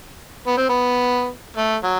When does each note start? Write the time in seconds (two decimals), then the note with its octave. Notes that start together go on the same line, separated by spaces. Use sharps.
0.47 B3
0.58 C4
0.69 B3
1.57 A3
1.84 F#3